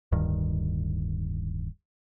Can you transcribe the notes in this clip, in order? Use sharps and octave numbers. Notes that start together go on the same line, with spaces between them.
D1 D2 G2 D#3